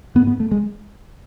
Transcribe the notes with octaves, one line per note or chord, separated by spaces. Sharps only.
G#2 B3
B3
A3
G#3